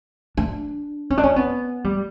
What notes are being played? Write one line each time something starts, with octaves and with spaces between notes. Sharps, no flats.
D4
C#4
D4
C#4
B3
G3